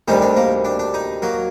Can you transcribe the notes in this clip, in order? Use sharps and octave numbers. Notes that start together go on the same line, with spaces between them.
D2 C3 D#3 G3 D#4
D4
A#3
D4
D4
D#4
F#3 A#3